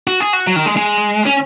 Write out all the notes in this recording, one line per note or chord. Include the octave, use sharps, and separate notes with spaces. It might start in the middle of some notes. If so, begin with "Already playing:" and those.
F#4
G#4
F#4
F#3
D#3
G#3
G#3
C#4